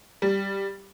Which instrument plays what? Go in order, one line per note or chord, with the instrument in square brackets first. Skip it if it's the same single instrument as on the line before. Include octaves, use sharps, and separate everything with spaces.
[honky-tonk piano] G3